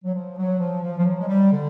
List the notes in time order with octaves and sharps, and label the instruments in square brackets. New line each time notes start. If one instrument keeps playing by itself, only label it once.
[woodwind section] F#3
F3
F#3
F3
F3
F3
F#3
G#3
G3
D3